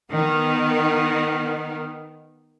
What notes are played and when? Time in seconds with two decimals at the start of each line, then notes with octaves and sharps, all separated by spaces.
0.11 D#3 B3